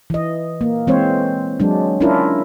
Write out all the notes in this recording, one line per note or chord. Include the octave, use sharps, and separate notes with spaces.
E3 D#5
A#3
E3 G#3 C4 C5 C#5
F#3 G#3 D4
C#4 D4 E4 F4 A#4